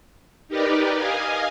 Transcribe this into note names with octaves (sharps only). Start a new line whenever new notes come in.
D#4 G4 A#4 B4 D5
D#5 F5 G#5